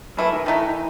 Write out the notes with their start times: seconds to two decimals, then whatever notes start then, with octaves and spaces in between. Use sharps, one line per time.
0.17 F#2 E3 A3 E4
0.33 D#3
0.46 D#3 E3 A3 D#4